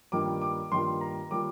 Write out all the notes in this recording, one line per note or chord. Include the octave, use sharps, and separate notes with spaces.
G2 D#3 G3 A#3 F4 D6
D6
G2 D#3 G3 A#3 F4 C6
A#5
D#3 G3 A#3 F4 D6